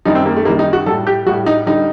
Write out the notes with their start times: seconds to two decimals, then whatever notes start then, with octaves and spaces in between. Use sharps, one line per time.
0.05 F#2 D#3 G3 D#4
0.15 C4
0.26 A#3
0.36 A3
0.45 F#2 D#3 G3 A#3
0.59 D#4
0.73 F#4
0.86 A2 G3 A4
1.07 G4
1.26 A2 G3 F#4
1.46 D#4
1.67 D3 G3 D#4